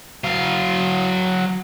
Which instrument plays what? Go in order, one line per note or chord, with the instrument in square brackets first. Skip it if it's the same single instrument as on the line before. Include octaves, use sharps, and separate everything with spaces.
[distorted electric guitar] F#3 F5